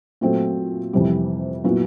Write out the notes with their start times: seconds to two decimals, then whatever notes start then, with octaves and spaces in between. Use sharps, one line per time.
0.21 A#2 F#3 A3 C4
0.93 F2 C3 E3 G3
1.64 A#2 F#3 B3 E4